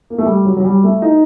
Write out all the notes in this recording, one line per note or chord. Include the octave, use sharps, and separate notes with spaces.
A#3
A3
G3
F#3
F#3
G3
A3
D#4